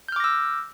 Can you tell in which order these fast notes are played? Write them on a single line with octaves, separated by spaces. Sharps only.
G6 F6 D6 A#6 E6